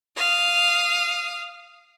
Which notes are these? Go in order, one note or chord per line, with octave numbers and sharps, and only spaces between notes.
F5 D#6